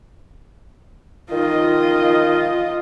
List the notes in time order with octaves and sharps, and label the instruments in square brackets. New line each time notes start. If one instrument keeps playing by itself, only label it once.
[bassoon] D#3 [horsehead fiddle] F4 D#5